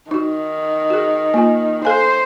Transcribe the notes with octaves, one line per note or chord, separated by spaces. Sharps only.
D#3 D#4 F#4
F#4 G#4
A#3 F4 G#5
A4 C5 F5 G#5